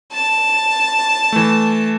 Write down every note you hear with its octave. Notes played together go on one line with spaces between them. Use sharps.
A5
E3 A3